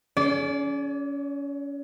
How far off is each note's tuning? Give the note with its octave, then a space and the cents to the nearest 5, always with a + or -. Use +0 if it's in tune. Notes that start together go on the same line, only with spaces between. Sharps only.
C#4 +25 G#4 +30 D5 -25